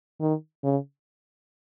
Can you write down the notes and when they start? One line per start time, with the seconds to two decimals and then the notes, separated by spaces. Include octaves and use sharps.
0.20 D#3
0.64 C#3